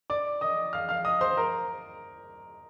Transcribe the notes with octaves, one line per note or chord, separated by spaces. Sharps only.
D5 D6
D#5 D#6
F5 F6
F5 F6
D#5 D#6
C5 C6
A#4 A#5